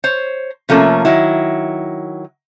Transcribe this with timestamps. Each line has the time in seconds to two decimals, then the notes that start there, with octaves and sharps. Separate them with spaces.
0.04 C5 C#5
0.69 C3 F3 A3 A#3 C#4
1.05 D#3 F#3 E4